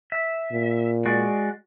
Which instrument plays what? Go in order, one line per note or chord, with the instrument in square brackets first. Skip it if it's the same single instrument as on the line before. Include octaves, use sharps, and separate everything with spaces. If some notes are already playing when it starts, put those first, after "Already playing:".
[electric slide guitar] E5
[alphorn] A#2
[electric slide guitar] G#3 F#4 D5